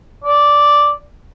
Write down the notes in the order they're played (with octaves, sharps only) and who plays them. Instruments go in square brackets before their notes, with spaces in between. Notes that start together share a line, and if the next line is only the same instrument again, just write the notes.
[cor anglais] D5